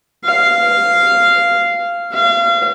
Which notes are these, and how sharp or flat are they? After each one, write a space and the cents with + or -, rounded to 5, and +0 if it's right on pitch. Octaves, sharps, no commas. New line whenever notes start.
F5 -10
F5 -35